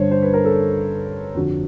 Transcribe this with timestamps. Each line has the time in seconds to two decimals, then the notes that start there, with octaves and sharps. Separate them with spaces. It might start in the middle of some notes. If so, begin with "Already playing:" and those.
Already playing: G2 D3 C5 C#5
0.11 C5
0.22 B4
0.34 A#4
0.45 A4
1.34 F2 D3 F#4